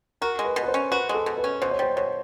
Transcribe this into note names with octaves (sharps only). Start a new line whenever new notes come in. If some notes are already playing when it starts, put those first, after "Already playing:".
F#4 A#4
G#3
B4
B2
B4
C5
C#4
F#4 B4
G#3
A4
B2
B4
C#4
B2 C5
C#5
G3 C5
B2 C#5